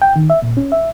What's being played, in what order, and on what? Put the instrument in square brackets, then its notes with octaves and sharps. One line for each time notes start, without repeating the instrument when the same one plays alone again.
[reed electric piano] G5
D#3
E5
A#2
C#4
E5